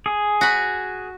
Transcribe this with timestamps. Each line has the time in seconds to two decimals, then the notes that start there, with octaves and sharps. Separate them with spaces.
0.06 G#4
0.41 F#4 B5